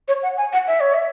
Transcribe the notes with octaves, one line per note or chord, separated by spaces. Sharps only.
C#5
F#5
G#5
F#5
E5
C#5
E5